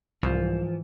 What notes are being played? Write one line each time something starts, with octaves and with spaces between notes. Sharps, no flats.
C2 G#2 E3 F3